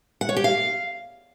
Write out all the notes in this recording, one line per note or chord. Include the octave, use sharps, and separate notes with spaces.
F#5
C#5
G4
F5